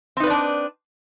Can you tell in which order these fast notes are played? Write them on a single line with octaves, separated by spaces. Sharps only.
C4 D#4 B4 D5 D4